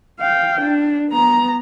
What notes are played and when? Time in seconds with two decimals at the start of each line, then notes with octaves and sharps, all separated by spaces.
0.20 F5 G5
0.61 D4
1.10 B3 A#5